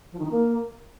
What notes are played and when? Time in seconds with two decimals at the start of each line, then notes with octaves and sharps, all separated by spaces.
0.12 F3
0.18 D#3
0.24 D#4
0.31 A#3